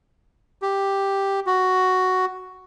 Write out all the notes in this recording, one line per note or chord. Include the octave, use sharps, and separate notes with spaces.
G4
F#4